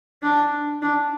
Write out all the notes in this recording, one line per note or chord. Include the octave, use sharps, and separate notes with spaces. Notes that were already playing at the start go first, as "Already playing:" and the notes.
D4
D4